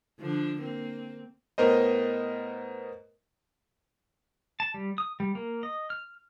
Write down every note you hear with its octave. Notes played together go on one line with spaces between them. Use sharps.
D3 F3 D4
A#3 C4
A2 B3 A#4 C5 D#5
A5
G3
D#6
G3
A#3
D#5
F6